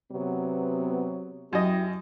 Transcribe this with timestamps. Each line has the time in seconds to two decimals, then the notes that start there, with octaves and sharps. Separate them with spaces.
0.12 C3 F#3 B3
1.53 F#2 E4 G4 D#5